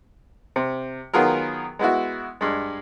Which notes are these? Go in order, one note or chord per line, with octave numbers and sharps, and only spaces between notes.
C3
D#3 F#3 B3 F4 G#4 A#4
G#3 B3 E4 F#4
G2 G#3